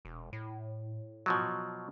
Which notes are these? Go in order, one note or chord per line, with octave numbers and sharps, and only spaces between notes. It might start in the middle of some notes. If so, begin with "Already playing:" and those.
E1
A2
B2 F3 F#3